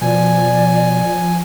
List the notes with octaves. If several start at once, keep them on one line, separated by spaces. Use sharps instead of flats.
B2 F3 D5 G#5